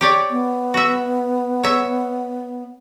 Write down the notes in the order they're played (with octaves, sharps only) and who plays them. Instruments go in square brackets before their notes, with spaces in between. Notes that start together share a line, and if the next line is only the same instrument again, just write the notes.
[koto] G4 C#5 D5
[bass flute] B3
[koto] F#4 E5
C#5 E5